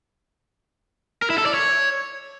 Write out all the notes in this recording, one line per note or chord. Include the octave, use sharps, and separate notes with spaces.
A#4
E4
A4
D5
C#5